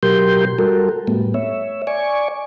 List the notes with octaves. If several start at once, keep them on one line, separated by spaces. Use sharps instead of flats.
B2 F#3 G4 A#4 C6 G6
G3 F#4 A4 A#4
A2 G3 A3 B3
C#5 E5
D5 G#5 C#6